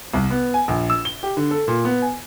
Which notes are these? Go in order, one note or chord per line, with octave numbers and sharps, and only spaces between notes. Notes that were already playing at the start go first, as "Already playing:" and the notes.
C2
B3
G#5
A#1
E6
G7
G4
D3
A4
A#2
B3
G#5